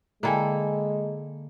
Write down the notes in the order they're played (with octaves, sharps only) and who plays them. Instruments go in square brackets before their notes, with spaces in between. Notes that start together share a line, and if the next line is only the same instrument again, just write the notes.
[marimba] D3 G5 G#5 [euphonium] G#3 [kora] A#3 E4 A4